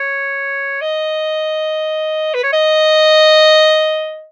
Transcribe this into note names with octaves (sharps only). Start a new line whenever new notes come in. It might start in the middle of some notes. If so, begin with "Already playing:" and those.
Already playing: C#5
D#5
B4
C#5
D#5